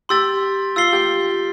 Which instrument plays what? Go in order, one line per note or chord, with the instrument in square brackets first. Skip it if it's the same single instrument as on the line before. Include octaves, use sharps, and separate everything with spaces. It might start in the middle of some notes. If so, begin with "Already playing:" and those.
[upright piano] G4 [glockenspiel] C6 E6 A6
[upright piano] F4 [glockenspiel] E6 A6 C7 G7
[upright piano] G4